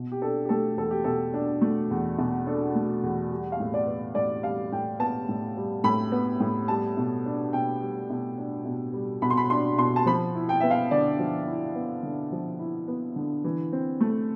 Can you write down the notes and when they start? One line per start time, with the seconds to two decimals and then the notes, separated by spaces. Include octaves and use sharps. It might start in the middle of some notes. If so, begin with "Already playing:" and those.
Already playing: B2
0.12 G4
0.22 D4 A4
0.45 G4
0.49 A3 A4
0.77 E2 A4
0.91 G4
1.04 B2 A4
1.33 D4
1.61 A3
1.91 E2
2.18 B2
2.46 D4 A4
2.75 A3
3.03 E2
3.32 G3
3.52 F5
3.60 A2
3.74 D5
3.87 B3
4.15 A2 D5
4.43 G3 F5
4.72 A2 G5
4.99 B3 A5
5.29 A2
5.57 G3
5.84 A2 B5
6.12 B3
6.40 A2
6.68 G3 A5
6.97 B2
7.26 D4
7.53 B2 G5
7.81 G3
8.10 B2
8.38 D4
8.65 B2
8.93 G3
9.22 B2 B5
9.30 C6
9.37 B5
9.50 D4 C6
9.78 B2 C6
9.96 A5
10.06 F3 B5
10.35 E4
10.49 G5
10.60 B3 E5
10.71 F5
10.91 D3 D5
11.19 F3
11.47 E4
11.75 B3
12.03 D3
12.32 F3
12.59 E4
12.88 B3
13.16 D3
13.44 E3
13.72 C4
14.01 A3